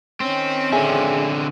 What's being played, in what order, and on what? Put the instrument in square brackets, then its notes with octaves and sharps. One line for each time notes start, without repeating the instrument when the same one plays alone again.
[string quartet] D#3 C#4 [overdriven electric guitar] C4
[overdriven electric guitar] D3 C4 [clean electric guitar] G#4 E5 G#5